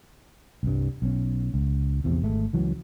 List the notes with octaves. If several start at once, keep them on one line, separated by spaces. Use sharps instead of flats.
C2 G2
B1 C#4
C#2
A#1 E2 C3
G#1 G#3 A3
C#2 E3 F#3